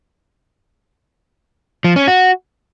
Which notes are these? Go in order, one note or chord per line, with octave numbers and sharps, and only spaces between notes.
F3
C#4
F#4